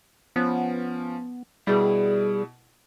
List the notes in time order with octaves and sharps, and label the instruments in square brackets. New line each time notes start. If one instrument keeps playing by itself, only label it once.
[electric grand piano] F3 C#4 [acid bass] B3
[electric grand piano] B2 E4 [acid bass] G3 [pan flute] G#4